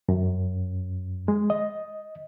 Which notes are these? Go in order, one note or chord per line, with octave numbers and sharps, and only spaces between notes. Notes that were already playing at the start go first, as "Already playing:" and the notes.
F#2
G#3
D#5